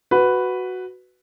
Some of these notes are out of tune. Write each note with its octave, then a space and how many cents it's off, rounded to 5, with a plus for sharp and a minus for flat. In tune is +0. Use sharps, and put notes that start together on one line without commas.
F#4 +0 B4 +5